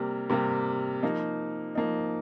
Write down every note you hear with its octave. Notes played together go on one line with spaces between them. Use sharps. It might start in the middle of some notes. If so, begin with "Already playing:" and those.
Already playing: C3 G3 A#3
C3 G3 A#3
F3 A#3 D#4
F3 A#3 D#4